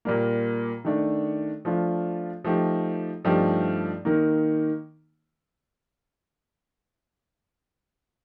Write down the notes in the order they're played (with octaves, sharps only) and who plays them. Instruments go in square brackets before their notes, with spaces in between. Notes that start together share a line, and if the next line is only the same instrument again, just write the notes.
[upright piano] A#2 G3 A#3
D#3 A3 D4
F3 A3 D4 F4
F3 A3 D#4 G4
G2 F3 A3 D#4 G4
D#3 A#3 D#4